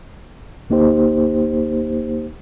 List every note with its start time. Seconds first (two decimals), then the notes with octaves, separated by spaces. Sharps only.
0.70 D2 A#3 D#4 G4 C5